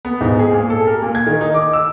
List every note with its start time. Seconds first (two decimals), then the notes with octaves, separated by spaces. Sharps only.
0.05 B3
0.21 G#2
0.39 G#4
0.52 A#2
0.70 A4
0.87 A#4
1.02 A#2
1.15 G#6
1.26 D#3
1.41 D#4
1.54 D6
1.73 E6